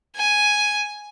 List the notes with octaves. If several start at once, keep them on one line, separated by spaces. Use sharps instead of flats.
G#5